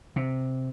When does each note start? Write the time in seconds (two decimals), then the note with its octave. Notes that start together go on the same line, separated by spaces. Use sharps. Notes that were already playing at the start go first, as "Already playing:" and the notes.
0.16 C3